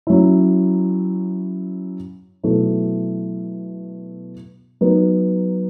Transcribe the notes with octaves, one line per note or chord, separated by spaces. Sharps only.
F#3 C#4 E4
B2 F#3 A3 E4
F#3 B3 D#4